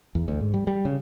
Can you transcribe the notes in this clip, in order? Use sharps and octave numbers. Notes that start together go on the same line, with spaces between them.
E2
D2
G#2
G3
G3
C#3